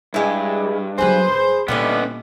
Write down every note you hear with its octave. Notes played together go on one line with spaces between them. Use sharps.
G2 G#3 E4
F#3 B3 G#4 B4 C5
G#1
A#2 D3 G3 B3 C#4 D4 E4 D#5